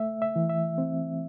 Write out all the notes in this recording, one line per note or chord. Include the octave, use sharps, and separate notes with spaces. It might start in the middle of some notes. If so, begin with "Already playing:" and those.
Already playing: A3 E5
E5
E3
E5
C4